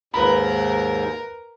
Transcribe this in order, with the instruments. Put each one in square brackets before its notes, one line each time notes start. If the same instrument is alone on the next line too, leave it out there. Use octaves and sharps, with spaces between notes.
[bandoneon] D#2 G#2 [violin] A#4 [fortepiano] B4 B5